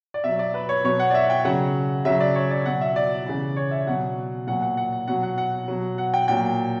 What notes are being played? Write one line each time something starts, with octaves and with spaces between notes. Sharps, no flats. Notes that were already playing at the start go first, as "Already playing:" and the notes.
D5
B2 F#3 E5
D5
B4
C#5
B2 F#3 C#5
F#5
D5
E5
G5
C#3 F#3 F#5
C#3 F#3 E5
D5
C#5
D5
B2 F#3 F#5
E5
D5
C#3 E3
C#5
E5
B2 F#3 F#5
A#2 F#3 F#5
F#5
F#5
F#5
B2 F#3 F#5
F#5
F#5
B2 F#3
F#5
G5
A#2 F#3 G5